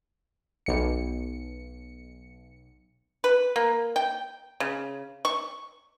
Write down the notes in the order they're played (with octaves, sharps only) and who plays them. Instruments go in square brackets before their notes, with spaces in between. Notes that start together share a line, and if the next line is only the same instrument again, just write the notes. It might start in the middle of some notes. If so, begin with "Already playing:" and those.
[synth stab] B1 C#7
[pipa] B4
A#3
G5
C#3
C#6